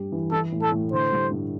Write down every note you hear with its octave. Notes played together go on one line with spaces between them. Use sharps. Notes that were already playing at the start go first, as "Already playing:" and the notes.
Already playing: G2 G4
E3
E3 A4
A2
A4
A2
D3 C5
G3
G2